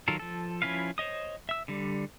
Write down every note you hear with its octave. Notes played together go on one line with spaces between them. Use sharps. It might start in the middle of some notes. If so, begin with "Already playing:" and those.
D#3 F#3 F4 A4 A#4
F3 A4
F3 C#4 E4 B4 F5
C5 C#5 D#5 D#6
E5 E6
D3 G3